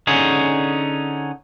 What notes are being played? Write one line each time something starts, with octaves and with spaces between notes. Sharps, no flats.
D3 C#4 D#4 G#4